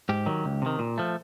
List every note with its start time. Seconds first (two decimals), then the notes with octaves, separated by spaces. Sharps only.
0.09 G#2 G4
0.26 D#3 F#3
0.45 C#2
0.62 C3 D#3
0.79 A#2
0.98 F3 A3